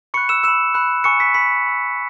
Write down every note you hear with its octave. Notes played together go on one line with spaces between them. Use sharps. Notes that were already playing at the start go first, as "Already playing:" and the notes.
B5 C#6 F#6 C#7
E6 E7
B5 E6 E7
B5 F#6
G#5 C#6 E6 C#7
B6
B5 E6 B6
B5 E6